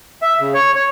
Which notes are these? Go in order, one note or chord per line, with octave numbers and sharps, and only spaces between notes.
E5
C#3
C#5
C#5